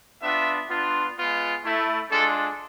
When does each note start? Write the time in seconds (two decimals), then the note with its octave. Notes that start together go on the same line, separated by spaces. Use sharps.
0.22 B3 D4 F4 E5
0.68 B3 D4 F4
1.16 G#3 B3 F4
1.64 A3 E4
2.10 G#3 D4 F4 A4